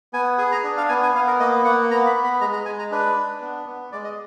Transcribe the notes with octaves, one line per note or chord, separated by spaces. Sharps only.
B3 G#5
G#4 G#5
A#5
D4
F5
B3 G#5
G#5
B3 F5
A#4
A#3 D#5
A#3 F#5
B3 A#5
B5
B3
B5
G#3 A#5
A#5
G#3 G#5
A#5
D4 B4
D4
B3
B3
G#3 D5
D#5